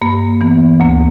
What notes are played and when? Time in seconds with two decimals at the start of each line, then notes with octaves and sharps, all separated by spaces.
0.02 G2 A#3
0.41 E3 B3
0.80 D2 A#3